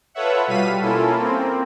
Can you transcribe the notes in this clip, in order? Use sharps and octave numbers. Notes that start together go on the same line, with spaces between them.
F4 A4 B4 C#5 E5 F#5
B2 G3 F5 B6 D#7
A#3 C#4 E4 F4 A4
A#3 C4